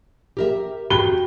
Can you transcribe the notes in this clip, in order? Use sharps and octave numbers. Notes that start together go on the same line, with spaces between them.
G4 A#4 E5
F#4 G4 G7